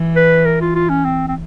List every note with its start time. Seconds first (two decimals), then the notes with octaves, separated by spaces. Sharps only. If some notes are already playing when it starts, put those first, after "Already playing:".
Already playing: E3
0.16 B4
0.45 A#4
0.61 F4
0.75 F4
0.89 C#4
1.05 C4
1.28 C4